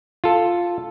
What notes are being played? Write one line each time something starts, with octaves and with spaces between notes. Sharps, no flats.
F4 A4